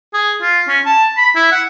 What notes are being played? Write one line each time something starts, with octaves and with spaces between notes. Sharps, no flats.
G#4
F4
C#4
A5
B5
E4
F#5